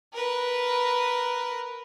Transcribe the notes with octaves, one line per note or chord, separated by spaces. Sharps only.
A#4 B4